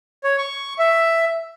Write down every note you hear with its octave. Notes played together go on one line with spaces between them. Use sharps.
C#5
C#6
E5